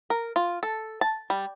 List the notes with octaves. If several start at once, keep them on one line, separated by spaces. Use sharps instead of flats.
A#4
F4
A4
A5
G3